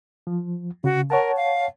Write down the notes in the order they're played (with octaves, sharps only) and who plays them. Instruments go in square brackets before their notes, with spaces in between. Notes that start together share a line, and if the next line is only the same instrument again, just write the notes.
[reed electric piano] F3
[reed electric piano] C#3 [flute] F#4
[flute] A#4 [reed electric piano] C#5 F#5 A5
[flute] F5